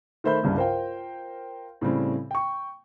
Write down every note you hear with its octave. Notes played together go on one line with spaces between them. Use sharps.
D#3 A3 C5 E5 B5 G6
C2 G2 C#3 G3
F4 A#4 C5 F5 G5
A2 C#3 G3 C4
G5 C#6